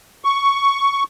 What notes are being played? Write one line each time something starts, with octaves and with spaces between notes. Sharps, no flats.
C#6